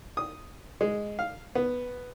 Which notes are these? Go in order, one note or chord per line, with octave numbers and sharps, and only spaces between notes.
D#6
G#3
F5
B3